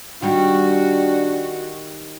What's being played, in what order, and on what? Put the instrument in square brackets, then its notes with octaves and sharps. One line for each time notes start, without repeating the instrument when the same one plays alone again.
[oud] D#3 G3 [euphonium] D4 [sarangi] F#4